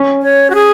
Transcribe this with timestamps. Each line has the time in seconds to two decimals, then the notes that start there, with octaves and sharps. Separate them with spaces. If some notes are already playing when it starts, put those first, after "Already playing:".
Already playing: C#4
0.22 C#5
0.50 F#4
0.55 G#4